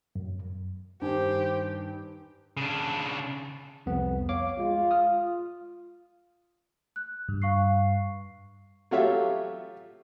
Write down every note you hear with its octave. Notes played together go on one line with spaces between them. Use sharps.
F#2
G2 D#3 G4 C5 G#5
C#3 D4
C2 F2 B3
C#5 F5 D6
G#3 F4
D#6 F6
F#6
G2
F5 C#6 C7
F#3 A3 F4 G4 C#5 E5